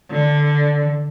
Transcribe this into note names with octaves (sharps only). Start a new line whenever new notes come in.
D3